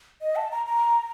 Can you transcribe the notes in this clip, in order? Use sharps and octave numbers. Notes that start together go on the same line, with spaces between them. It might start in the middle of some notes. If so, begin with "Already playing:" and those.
D#5
A5
A#5
A#5